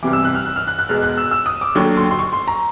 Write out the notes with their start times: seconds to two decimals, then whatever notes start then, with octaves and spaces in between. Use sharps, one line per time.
0.02 C2 C3 E3 D6
0.13 E6
0.25 F#6
0.35 F6
0.45 F#6
0.56 F6
0.67 F#6
0.79 F#6
0.89 E2 B2 G#3 F6
1.03 F#6
1.18 E6
1.31 E6
1.46 D#6
1.61 D6
1.75 D#2 D3 F#3 C#6
1.97 C6
2.11 C6
2.19 C#6
2.33 C6
2.48 A#5